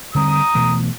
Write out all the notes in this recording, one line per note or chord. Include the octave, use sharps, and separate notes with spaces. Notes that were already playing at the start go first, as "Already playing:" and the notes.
D3 G3 C4 A#5 D#6
B2 E3 A3